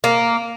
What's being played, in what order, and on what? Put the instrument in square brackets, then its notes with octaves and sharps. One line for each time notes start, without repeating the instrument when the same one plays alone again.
[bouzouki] A#3